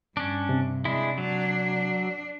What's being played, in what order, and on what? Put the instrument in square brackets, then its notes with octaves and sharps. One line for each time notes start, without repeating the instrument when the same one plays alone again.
[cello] G2 [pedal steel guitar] C#4 D4
[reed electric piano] C3
[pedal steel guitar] G#3 E4 [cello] D4
[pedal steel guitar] F#3 [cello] D4